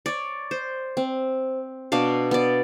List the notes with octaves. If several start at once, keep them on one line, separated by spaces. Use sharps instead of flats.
C#5 D5
C5
C4
B2 D4 F5
B3 D5